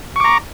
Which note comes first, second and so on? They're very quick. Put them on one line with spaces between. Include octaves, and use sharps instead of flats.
C#6 D6 A#5